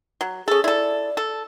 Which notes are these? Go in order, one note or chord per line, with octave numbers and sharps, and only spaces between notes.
F#3
C#4 G#4 A4
E4 A4 D5
A4